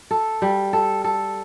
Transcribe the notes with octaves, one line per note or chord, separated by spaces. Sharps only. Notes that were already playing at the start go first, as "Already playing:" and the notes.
A4
G3
A4
A4